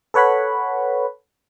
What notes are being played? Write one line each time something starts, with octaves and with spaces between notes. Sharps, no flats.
A4 B4 C#5 F#5 B5